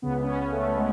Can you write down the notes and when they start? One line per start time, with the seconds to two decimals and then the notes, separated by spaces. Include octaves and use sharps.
0.02 C#2 C#3 B3
0.24 C#4
0.26 B3
0.51 A3
0.75 G#3